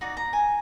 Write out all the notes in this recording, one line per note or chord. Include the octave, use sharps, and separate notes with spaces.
D#4 F#4 D5
A#5
G#5